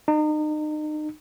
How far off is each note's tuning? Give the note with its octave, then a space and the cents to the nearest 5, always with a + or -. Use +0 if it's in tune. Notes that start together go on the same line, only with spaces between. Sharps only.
D#4 -35